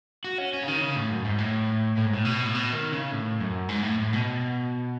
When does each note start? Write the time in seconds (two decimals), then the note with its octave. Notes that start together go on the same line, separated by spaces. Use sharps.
0.24 F#4
0.38 C#4
0.53 C#4
0.63 C#3
0.68 D#3
0.81 C#3
0.96 A2
1.10 F#2
1.25 G#2
1.38 A2
1.97 A2
2.05 G#2
2.14 A2
2.25 B2
2.46 A2
2.54 B2
2.73 D#3
2.92 C#3
3.12 A2
3.40 F#2
3.69 G#2
3.83 A2
3.98 A2
4.13 B2